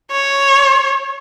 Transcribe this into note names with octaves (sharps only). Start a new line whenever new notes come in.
C#5